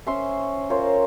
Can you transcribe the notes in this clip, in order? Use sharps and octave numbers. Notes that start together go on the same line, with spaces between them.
C#4 C5 E5 C6 C#6
F4 A#4 C5 C#5 F5